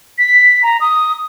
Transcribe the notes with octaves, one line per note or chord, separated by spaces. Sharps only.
B6
A#5
D#6